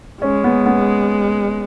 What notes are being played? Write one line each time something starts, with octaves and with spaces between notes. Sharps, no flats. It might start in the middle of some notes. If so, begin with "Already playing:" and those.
G#3 C#4
B3
B3